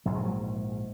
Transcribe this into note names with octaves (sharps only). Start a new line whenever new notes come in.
A#1 G#2 F#3
G#3
F#3